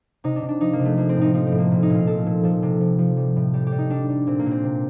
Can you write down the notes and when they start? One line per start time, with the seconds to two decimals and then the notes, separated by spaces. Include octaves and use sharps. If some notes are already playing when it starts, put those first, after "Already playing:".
0.24 C3 D#4
0.36 D4
0.42 C3
0.49 D4
0.60 F3 D#4
0.73 A#3
0.79 C3
0.85 A3
0.97 F3 A#3
1.09 C4
1.17 A2
1.22 D#4
1.34 F3 D#4
1.47 C4
1.52 A2
1.58 A#3
1.71 A#2 A#3
1.83 D#4
1.90 A#2 F4
2.07 F3 A4
2.26 A#2
2.44 F3 A4
2.63 C3
2.80 F3
2.98 F3
3.17 G3
3.36 A2
3.54 G3 G4
3.67 G4
3.72 G3
3.78 D#4
3.90 G3 D4
4.09 G3
4.27 A#2 C4
4.39 A#3
4.46 A#2 C4
4.64 C3